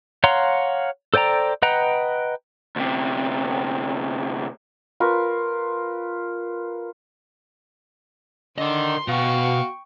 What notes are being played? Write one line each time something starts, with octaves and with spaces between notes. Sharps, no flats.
C#5 F5 F#5 A#5 C6
A4 C5 D5 G5 A#5
B4 D#5 F#5 G5 A#5
D2 C3
F4 A#4 B4 C#6
D3 A#4 D#5 C6
B2 F#4 F5 G5 C#6